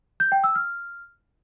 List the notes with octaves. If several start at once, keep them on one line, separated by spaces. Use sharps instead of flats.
G6
G5
E6
F6